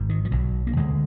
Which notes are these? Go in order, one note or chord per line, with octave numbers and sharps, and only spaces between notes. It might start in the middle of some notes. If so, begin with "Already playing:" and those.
Already playing: G#1 G#2
D#3
F3
B1 B2 F#3
A#3
D2 D3 G#3